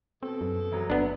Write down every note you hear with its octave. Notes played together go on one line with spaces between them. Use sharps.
B2 C4 A4
F#2
F1 F#3
G1 B3 D4